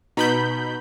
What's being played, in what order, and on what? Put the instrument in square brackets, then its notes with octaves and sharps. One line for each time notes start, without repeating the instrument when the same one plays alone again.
[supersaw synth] B2 B5 G6 [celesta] D#4 B4 A#5